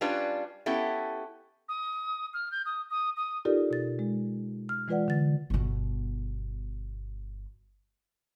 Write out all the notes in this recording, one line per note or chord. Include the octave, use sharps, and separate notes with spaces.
G3 C#4 D4 F4 B4 D5
B3 C#4 E4 G4 A4
D#6
F6
G6
D#6
D#6
D#6
D#4 F4 G4 A4 A#4 D5
B2 A6
G#3
F6
E3 G#3 F4 B4 D5 F#5
D3 A6
G1 B2